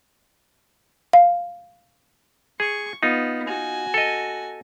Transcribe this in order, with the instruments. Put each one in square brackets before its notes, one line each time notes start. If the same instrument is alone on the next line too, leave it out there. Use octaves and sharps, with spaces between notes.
[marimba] F5
[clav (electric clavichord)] G#4 [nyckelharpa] C#6
[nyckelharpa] B3 [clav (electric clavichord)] D#4 F4
[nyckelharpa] F#4 G#5
[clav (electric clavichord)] A4 D#5